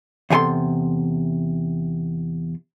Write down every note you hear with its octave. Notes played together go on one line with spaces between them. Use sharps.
E2 C3 G#4 A4 C6